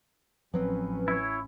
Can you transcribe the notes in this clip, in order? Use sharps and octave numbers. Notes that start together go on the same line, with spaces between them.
A1 F3 F#3 C4 C#4 B4
E4 C#5